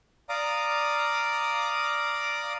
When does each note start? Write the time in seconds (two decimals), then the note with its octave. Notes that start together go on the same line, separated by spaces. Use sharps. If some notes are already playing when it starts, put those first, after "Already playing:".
0.29 D5 F5 A#5 D6 D#6